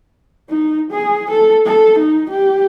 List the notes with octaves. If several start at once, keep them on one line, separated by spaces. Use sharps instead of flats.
D#4
G#4
A4
A4
D#4
G4